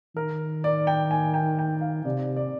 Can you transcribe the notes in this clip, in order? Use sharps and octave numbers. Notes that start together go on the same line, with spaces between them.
D#3 A#4
D5
G5
G#5
G5
G5
F5
C3 D5
D5